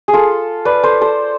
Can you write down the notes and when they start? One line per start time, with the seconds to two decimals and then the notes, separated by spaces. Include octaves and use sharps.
0.08 G#4
0.13 F4 A4
0.65 B4 D5
0.83 A4 C5
1.01 A4 C5